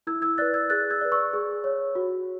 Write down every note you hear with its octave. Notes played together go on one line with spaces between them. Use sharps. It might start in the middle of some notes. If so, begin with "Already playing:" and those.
E4 E6 G#6
E6 G#6
B4 D5 F#6 A6
E6 G#6
G#4 F#6 A6
E6 G#6
B4 D5
C#6 E6
G#4
C#5
F#4